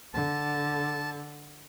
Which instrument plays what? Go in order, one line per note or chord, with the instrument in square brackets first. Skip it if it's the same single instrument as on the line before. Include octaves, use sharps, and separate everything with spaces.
[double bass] D3 [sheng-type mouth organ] A5